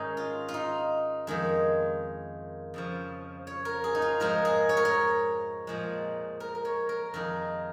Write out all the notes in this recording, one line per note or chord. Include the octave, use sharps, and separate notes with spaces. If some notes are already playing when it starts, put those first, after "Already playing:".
Already playing: G#2 D#3 G#3 C#4 D#4
F4
F4
D#4
F2 D#3 G#3
F2 C#3 F3
C#5
A#4
G#4
D#4
F4
G#2 F3 G#3 A#4
G#4
C#5
A#4
C#5
A#2 F3 G#3
A#4
A#4
C#5
A#4
F2 D#3 G#3 A#4